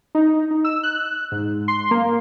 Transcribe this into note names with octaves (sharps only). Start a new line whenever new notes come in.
D#4
D#4
E6
F#6
G#2
C6
A#3